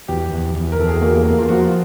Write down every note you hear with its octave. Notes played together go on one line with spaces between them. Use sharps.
E2 G4
E2
E2
A#4
E2 A4
G#4
G4
A#3 F#4
A#3
F4
F3 F#4